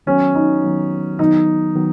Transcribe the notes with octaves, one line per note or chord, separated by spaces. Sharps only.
D#3 F#3 B3 C#4 F#4
D#4
D#3 F#3 B3 F#4
D#3 F#3 B3 D#4
D#3 F#3 B3